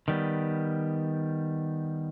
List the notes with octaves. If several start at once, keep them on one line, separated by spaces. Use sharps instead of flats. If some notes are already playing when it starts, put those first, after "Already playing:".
D#3 G3 B3